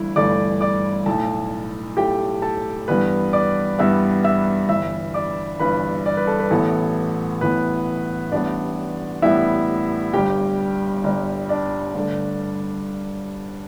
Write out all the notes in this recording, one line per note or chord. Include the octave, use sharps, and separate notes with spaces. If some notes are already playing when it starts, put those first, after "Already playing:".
Already playing: G1 G2 E3 A3 E4
G1 G2 E3 A3 D5 D6
D5 D6
B1 A2 A3 A4 A5
B1 A2 A3 G4 G5
A4 A5
G2 E3 G3 B3 B4 B5
D5 D6
G2 E3 G3 B3 E5 E6
E5 E6
G1 G2 E3 E5 E6
D5 D6
G1 G2 E3 B4 B5
D5
B4
A4
B4
A1 A2 E3 B3 A4
A1 A2 E3 B3 B4
A1 A2 G3 B3 D4 D5
A1 A2 G3 B3 E4 E5
G1 G2 G3 G4 G5
G1 G2 G3
D4 D5
G2 D3 A3